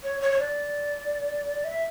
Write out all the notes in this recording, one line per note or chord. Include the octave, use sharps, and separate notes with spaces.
C#5
C#5
C#5
D5
E5